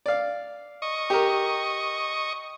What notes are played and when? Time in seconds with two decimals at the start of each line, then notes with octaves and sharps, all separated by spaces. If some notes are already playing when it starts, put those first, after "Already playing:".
0.06 D5 F5
0.82 D#5 C#6
1.10 G4 A#4